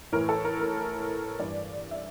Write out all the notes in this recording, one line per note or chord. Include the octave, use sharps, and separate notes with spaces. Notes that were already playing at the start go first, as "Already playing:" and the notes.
A2 E3 A#4
A4
A#4
A#4
G2 E3 D5
E5